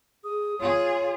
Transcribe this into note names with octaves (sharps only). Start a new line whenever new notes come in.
G#4 D#6
F4 G#4 C#5